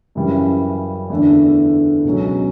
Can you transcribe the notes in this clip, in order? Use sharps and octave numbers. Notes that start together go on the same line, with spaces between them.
F#2 C#3 E3 G3
E2 D3 A3 D4
C#2 B2 F#3 C#4